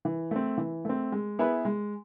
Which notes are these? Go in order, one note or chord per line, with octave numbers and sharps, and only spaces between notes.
E3
A3 C4
E3
A3 C4
G#3
B3 E4 G#4 B4
G#3